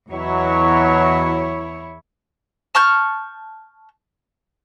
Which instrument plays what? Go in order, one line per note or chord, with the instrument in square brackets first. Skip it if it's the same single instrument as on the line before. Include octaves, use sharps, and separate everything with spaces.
[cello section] E2 E4 C#5 [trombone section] B2 F#3
[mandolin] A5 C#6 F6 G6